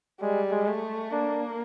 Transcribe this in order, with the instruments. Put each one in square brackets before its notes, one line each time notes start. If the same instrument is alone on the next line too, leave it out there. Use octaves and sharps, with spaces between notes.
[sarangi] G3 [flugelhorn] G#3
[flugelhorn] G#3
[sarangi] A3
[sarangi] A#3 [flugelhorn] D4